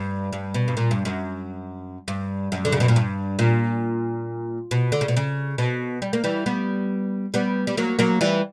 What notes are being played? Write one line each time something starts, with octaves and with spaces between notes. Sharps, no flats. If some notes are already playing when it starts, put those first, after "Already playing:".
Already playing: G2
G2
B2
G2
A#2
G2
F#2
G2
F#2
D3
C#3
B2
A#2
G2
A#2
B2
D3
C#3
B2
C#3
B2
G3
A#3
E3 G3
G3 B3
G3 B3
G3
F#3 A#3
F#3 A#3
E3 G3